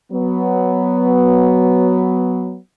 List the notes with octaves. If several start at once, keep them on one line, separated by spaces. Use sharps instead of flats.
F#3 B3